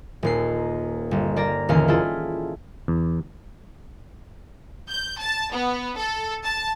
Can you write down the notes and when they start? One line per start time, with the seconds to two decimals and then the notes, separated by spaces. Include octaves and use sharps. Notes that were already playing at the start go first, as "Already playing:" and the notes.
0.23 D#1 D#2 C7
1.11 G1
1.36 A#3 D5 A#5 A#6
1.69 D#1 D#2 D3 E3 C#4 F5
1.88 E4 F4 G#4 A4
2.88 E2
4.89 G6
5.19 A5
5.53 B3
5.97 A4
6.44 A5